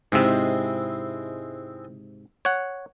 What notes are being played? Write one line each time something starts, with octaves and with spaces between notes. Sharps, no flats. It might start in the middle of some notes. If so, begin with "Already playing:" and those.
G#2 C3 G#3 C4 E4
C#5 F#5